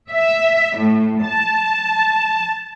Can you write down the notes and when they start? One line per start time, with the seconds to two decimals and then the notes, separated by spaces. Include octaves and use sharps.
0.12 E5
0.78 A2
1.25 A5